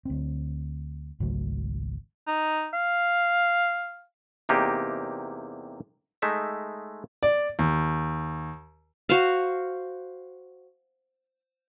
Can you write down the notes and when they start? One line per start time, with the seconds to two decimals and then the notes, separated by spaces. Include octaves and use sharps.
0.05 D2 C4
1.20 G#1 C#2 F#3 A3
2.27 D#4
2.73 F5
4.49 E2 C3 A#3 D#4 G4
6.22 G#3 A3 D#4 E5
7.23 D5
7.59 D#2
9.09 F#4 C5 F5